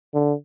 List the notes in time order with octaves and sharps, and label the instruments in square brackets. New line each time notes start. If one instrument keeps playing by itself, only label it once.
[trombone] D3